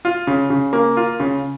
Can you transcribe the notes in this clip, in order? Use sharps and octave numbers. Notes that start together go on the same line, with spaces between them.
F4
C#3
C#3
A#3
F4
C#3